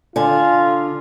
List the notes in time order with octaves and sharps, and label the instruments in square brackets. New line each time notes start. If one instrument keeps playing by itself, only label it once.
[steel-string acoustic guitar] D3 G#5 [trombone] F4